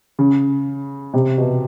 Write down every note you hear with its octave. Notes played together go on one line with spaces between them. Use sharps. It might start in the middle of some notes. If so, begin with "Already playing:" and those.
C#3
C3
B2